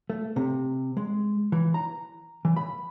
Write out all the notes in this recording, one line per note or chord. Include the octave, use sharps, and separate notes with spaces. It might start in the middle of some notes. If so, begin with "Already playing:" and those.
A3
C3
G#3
E3
A#5
E3
B5